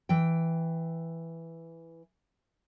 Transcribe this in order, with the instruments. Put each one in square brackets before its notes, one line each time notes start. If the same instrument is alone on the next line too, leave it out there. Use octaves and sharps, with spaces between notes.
[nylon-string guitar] E3 G5